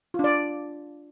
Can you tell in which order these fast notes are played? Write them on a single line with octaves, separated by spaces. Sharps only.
F4 D4 D5